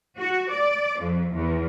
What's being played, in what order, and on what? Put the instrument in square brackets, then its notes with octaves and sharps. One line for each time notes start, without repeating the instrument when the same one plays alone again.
[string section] F#4
D5
F2
E2